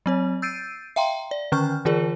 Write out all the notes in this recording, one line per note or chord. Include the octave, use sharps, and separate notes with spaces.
F#3 C4 C#5
E6 G6 A6 C7 D7 D#7
E5 F5 G5 A#5 C6
D5
D3 D#3 C#4 C#6 F6 G6
D3 E3 F4 G#4 A#4 D5